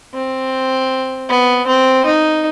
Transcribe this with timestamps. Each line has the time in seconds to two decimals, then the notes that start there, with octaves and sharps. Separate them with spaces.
0.14 C4
1.29 B3
1.67 C4
2.06 D#4